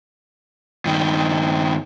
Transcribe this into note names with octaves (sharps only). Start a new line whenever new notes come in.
G2 D#3